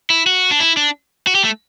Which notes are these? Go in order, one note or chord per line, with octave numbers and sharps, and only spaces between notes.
E4
F#4
D4
E4
D4
F#4
G4
A3